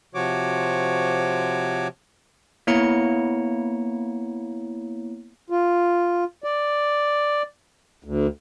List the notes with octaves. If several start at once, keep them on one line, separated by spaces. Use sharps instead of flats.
C3 F3 F#4 C#5 D6
A#3 B3 E4 C#5 A#5 C#7
F4
D5
D2